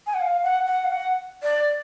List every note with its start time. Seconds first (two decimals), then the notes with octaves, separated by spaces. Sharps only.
0.06 G#5
0.14 F#5
0.21 F5
0.44 F#5
0.66 F#5
0.85 F5
0.90 F#5
1.43 D5